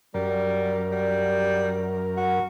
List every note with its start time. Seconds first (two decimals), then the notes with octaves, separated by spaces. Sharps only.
0.14 F#2 G3 A#4
0.92 G3
2.17 F#4